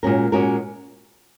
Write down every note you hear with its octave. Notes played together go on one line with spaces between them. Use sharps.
A#2 G#3 C#4 F#4 A#4
A#2 G#3 C#4 F#4 A#4